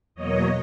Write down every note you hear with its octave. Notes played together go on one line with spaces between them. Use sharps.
E2 B2 F#3 A#3 C#5 D#5